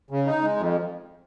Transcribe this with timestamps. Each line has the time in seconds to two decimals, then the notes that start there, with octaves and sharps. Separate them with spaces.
0.11 C#3
0.26 D#4
0.42 G#3
0.57 F2